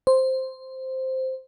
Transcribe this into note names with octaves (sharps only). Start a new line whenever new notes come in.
C5